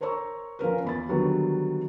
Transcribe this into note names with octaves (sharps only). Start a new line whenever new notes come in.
A#4 C5 C#5 A#5 C#6 E6
F3 C#4 A#4 B4
E2 B5 A6
D3 D#3 F#3 G3 B3 F#4